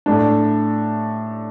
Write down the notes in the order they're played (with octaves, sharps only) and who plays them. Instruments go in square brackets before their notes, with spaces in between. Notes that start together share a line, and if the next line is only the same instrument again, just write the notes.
[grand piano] A2 A3 D4